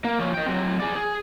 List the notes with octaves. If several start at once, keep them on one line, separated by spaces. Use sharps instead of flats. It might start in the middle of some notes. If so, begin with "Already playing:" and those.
A#3
F3 C#4
D#5 G5
F#3 C4
G#4 D5
G#4